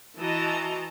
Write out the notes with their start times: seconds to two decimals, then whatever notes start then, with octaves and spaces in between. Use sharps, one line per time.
0.18 E3 F#4 D#5 A5 A#5